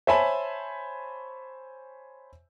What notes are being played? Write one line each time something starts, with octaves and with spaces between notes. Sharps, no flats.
C5 C#5 E5 G#5 A5 B5